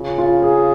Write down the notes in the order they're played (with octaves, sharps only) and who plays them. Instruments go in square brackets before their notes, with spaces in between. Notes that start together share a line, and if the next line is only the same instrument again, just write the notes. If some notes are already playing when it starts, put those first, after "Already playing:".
Already playing: [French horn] C#3 [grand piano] F4
[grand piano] F4
G#4